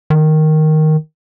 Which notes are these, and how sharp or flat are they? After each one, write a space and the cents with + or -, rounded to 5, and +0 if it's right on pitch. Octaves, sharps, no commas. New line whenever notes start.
D#3 +0